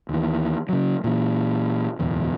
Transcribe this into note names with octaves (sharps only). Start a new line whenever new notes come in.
D#2 E3
C#3 F#3
A#2 E3
D1 E2 B2